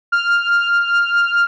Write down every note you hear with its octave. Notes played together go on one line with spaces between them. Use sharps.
F6